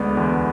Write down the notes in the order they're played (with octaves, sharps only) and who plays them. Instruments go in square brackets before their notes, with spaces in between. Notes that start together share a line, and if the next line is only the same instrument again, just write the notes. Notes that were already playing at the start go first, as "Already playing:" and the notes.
Already playing: [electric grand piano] D2 G#3 B3 D5
E2